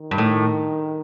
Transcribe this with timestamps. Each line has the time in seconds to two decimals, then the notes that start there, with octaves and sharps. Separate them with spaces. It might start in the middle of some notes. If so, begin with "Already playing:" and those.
Already playing: D#3
0.11 G2
0.18 A2